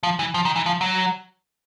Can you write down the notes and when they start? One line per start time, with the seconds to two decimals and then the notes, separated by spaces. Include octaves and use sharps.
0.03 F3
0.19 E3
0.34 F3
0.45 D#3
0.56 E3
0.66 F3
0.81 F#3